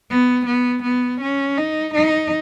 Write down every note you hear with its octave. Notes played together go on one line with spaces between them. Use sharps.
B3
B3
B3
C#4
D#4
D#4